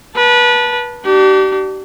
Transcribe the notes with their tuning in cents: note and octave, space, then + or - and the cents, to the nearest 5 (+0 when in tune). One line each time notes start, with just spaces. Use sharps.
B4 -25 A5 +0
D4 +20 G4 -35